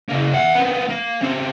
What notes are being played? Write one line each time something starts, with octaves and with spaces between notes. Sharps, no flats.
C#3 A#3
E5 F#5
B3 C4
A#3
C#3 C4